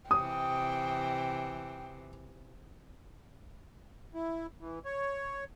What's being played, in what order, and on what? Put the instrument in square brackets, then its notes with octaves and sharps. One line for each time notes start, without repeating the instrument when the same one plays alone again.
[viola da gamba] C3 E3 [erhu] G5 [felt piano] D#6
[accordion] E4
E3
C#5